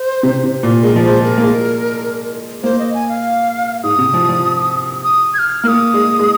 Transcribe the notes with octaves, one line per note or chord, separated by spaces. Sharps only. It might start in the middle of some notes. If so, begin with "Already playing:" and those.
Already playing: C5
C3
C3
A#2
G#3 A#4
F3
G#3 C5
A#4
A#3
G#3
A#3 C5
D#5
G#5
F5
G#2 D#6
C3
F3
F3
D#6
G#6
F6
A#3 F6
D#6
G#3
G#3